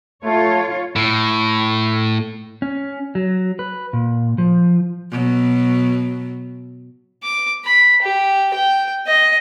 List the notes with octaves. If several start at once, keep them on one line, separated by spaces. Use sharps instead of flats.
A3 F4 C#5
A2
C#4
F#3
B4
A#2
F3
B2 F#3
D6
B5
G4
G5
D#5